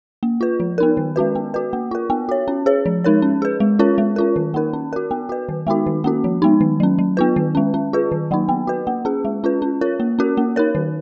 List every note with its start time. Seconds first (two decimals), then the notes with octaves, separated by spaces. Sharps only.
0.23 A#3
0.41 F4 B4
0.60 F3
0.78 B3 D#4 A#4
0.97 D#3
1.16 G#3 C#4 F#4 B4
1.35 B3
1.54 F#4 B4
1.73 A#3
1.91 F4 A#4
2.10 B3
2.29 F#4 C#5
2.48 C#4
2.66 G#4 C#5
2.86 F3
3.04 G#3 D#4 A#4 C#5
3.22 C#4
3.42 G#4 B4
3.60 G#3
3.79 C#4 F4 A#4 C#5
3.98 G#3
4.16 C#4 F4 A#4
4.36 D#3
4.54 A#3 D#4 A#4
4.73 C#4
4.93 F#4 A#4
5.11 B3
5.29 F#4 B4
5.49 D#3
5.67 G#3 B3 D#4 F#4
5.87 D#3
6.04 A#3 C#4 F#4
6.24 F3
6.42 G#3 B3 D#4
6.61 D#3
6.80 F#3 C#4
6.99 F#3
7.17 B3 F4 B4
7.36 D#3
7.55 G#3 C#4
7.74 C#4
7.93 F4 G#4 B4
8.12 D#3
8.31 F#3 A#3 D#4
8.49 B3
8.67 F#4 B4
8.87 A#3
9.05 C#4 G#4
9.25 G#3
9.44 C#4 F4 B4
9.62 C#4
9.81 F4 A#4 C#5
10.00 A#3
10.19 C#4 F#4 A#4
10.37 A#3
10.56 D#4 A#4 C#5
10.75 D#3